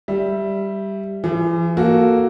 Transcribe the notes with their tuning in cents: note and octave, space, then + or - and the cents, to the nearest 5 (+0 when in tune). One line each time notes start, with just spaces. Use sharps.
G3 +0 E5 +5
E3 +45 G#4 +0
A#3 +0 F#4 +0 A4 +0